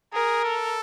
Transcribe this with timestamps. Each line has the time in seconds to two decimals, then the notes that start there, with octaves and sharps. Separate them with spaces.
0.13 G#4 A#4
0.44 A4